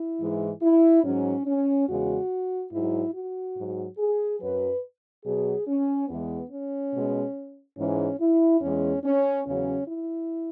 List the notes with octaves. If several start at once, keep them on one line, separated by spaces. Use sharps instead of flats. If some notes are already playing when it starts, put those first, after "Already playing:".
Already playing: E4
G#2 E3 G#3
E4
G#2 F#3 C#4
C#4
E2 C#3 G#3 F#4
G#2 F#3 E4
F#4
G#2 F#3
G#4
F#2 F#3 B4
B2 F#3 G#4
C#4
E2 E3 G#3 B3
C#4
B2 G#3
G#2 E3 G#3 C#4
E4
E2 E3 G#3 C#4
C#4
E2 C#3 F#3 C#4
E4